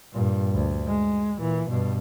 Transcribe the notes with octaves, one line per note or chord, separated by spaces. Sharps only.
G2 A#2
D2
G#3
A#2 E3
G2 B2